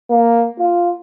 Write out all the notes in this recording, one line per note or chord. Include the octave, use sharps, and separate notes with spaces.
A#3
F4